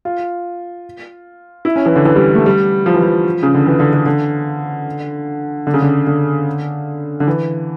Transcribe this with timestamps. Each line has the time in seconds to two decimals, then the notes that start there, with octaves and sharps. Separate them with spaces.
0.05 F4
1.65 E4
1.76 C#4
1.86 E3
1.96 D3
2.05 E3
2.16 G3
2.35 A3
2.46 G3
2.86 F3
2.94 E3
3.03 F3
3.43 C#3
3.54 D3
3.66 E3
3.80 D3
3.93 D3
4.06 D3
5.67 D3
5.74 C#3
5.82 D3
6.07 D3
7.20 D3
7.27 E3